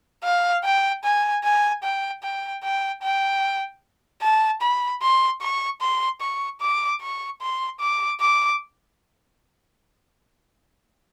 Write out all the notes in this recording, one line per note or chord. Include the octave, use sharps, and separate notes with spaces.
F5
G5
G#5
G#5
G5
G5
G5
G5
A5
B5
C6
C#6
C6
C#6
D6
C#6
C6
D6
D6